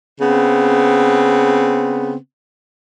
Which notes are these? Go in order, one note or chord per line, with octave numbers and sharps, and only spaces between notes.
C#3 B3 C4